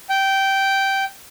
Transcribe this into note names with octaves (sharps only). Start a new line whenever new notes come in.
G5